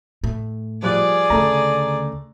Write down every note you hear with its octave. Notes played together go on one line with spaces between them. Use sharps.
A2
F3 G3 G#4 D5 F#6
D2 C#3 A3 A#5